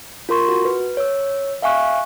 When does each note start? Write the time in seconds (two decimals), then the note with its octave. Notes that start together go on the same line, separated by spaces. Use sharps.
0.29 F4 A#4 C6 C#6
0.49 F#4
0.65 B4
0.97 C#5 E6
1.62 E5 F5 G#5 C#6 F#6